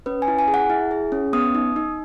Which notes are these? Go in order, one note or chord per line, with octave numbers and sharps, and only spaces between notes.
C#4 B4
G#5
E4
G#5
G#4
F#5
E4
G#4
C#4
B3 D#6
D#4
D#4